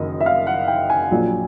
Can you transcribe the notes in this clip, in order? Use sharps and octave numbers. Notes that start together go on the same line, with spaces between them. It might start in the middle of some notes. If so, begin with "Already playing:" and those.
Already playing: F#1 F#2 D#3 D#5
E5
F5
F#5
G5
G#5
A#1 A#2 F#3